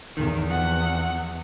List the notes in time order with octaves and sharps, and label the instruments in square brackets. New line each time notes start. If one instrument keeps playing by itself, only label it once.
[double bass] E2 [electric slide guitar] D#3
[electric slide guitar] F2 [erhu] F#5